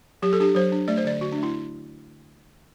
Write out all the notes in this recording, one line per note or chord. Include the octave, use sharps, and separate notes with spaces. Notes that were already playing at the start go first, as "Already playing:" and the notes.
F#3 G4
A4
D4 G4
F#3 C5
D4
A3 D5
C5
D3 D5
D3 F#4
D4
A3
E4